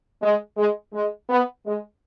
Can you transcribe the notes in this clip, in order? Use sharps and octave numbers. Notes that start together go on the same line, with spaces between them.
G#3
G#3
G#3
B3
G#3